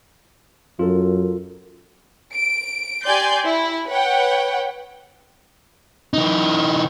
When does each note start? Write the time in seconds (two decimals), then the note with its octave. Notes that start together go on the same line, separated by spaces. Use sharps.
0.79 F#2 F4 A4 A#4
2.35 D7
3.05 G4 D5 G#5 C6 G6
3.46 E4
3.88 B4 C#5 F#5 G5
6.14 E3 D#4